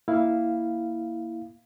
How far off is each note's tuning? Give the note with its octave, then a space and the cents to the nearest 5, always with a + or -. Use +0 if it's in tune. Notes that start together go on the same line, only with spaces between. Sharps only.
A#3 +0 E4 -5 F5 -5